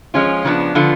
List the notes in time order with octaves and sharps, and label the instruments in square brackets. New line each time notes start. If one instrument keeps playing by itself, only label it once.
[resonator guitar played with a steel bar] F3 G#3 C#4 F4
C#3 F3 B3 D4
D3 F3 B3 F4